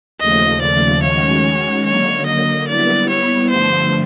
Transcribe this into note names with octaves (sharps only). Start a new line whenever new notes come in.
D#2 C#3 F3 A3 D#5
D5
D#3 G#3 C#4 F#4 C#5
D3 F#3 A#3 C#5
D#5
G3 B3 E4 D5
C#5
G2 D3 F3 A3 C5